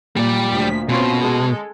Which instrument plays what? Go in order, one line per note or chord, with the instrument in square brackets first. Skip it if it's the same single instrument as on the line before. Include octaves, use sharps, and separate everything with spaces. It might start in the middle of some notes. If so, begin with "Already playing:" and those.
[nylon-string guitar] A#2 [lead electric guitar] G3 D5
[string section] D2 F3 B6
[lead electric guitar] B2 [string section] C4 C#4 F4
[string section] G#3 A4